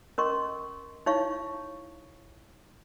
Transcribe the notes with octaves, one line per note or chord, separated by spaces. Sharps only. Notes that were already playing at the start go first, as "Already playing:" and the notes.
C#4 A#4 D#5 C6 C#6
D#4 E4 C#5 F5 C#6